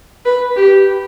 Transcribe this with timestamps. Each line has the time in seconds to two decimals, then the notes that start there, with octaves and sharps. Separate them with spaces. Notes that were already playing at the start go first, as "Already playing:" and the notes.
0.25 B4
0.56 G4